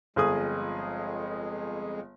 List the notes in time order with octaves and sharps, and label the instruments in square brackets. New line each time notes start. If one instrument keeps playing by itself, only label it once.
[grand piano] G1 G#4 D#6 [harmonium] F2 G#3